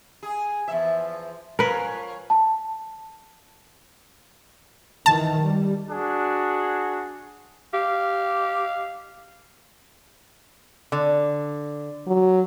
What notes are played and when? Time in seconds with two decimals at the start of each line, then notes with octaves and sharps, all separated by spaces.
0.23 G#4
0.68 E2 F3 E5
1.59 F3 C#4 A#4 B4
2.30 A5
5.06 D#3 E3 A5
5.42 G3
5.89 D4 F#4 G#4
7.73 G4 F5
10.92 D3
12.07 F#3